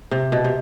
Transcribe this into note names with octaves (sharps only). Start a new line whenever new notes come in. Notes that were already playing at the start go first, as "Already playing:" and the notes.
C3
B2
C3